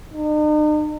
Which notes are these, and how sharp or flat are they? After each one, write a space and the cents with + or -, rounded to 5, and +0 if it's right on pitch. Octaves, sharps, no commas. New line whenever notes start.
D#4 -45